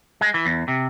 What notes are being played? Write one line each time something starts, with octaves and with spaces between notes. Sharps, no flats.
G#3
E3
E2
C3